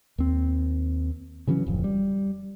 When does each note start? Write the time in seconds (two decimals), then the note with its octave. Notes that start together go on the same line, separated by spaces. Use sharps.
0.18 D#2 C4
1.47 C#3 E3 F#3 C#4
1.66 D1 F2
1.84 G3